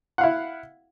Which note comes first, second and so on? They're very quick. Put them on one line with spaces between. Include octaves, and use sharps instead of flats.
F#5 F5 E4